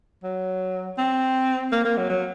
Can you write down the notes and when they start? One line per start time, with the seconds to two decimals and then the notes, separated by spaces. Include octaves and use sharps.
0.23 F#3
0.98 C4
1.72 A#3
1.85 A#3
1.97 F#3
2.09 F#3